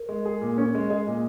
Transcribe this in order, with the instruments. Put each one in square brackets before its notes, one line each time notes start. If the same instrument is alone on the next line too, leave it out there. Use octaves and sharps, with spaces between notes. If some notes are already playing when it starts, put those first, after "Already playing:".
Already playing: [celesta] A#4
[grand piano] G#3
G#4
A#2
C#4
G#3
[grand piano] G#4 [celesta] D#5
[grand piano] A#2